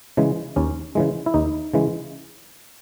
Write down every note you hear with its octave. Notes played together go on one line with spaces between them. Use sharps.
C#3 E3 G#3
D#2 C#4
C#3 E3 G#3
E4
D#2 D#4
C#3 E3 G#3